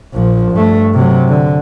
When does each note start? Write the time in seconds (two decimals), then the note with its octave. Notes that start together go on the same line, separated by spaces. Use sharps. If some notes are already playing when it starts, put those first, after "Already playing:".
0.13 A#1 F3
0.52 G2 A3
0.94 C3 F#3
1.29 D3